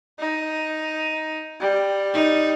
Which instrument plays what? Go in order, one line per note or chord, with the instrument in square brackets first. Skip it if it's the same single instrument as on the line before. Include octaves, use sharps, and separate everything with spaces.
[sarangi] D#4
G3
[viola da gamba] D#4